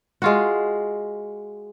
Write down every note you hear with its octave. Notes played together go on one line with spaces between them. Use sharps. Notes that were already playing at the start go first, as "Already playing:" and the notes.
G#3 F4 F#4